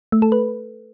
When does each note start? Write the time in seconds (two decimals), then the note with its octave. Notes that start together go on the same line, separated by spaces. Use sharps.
0.12 A3
0.22 A4
0.32 B4